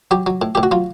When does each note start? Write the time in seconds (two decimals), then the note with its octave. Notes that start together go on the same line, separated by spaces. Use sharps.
0.11 F#3 G4
0.26 F#3
0.42 A2
0.55 A2 G4
0.63 F#4
0.71 F#3 F4